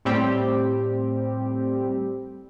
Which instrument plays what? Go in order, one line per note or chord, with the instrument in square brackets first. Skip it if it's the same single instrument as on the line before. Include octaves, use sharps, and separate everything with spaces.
[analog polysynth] A2 G3 C4 G4